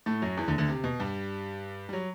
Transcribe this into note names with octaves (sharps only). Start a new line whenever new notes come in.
A2 A3
F#2 F#3
E2 E3
D2 D3
D2 D3
C3
B2
G2 G3
G3
F#3